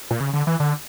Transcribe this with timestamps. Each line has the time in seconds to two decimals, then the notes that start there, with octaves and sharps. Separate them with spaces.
0.11 A#2
0.20 C#3
0.33 D3
0.47 E3
0.60 D3